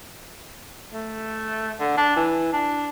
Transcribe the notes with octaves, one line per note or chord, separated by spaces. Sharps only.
A3
D3
D4
E3
D4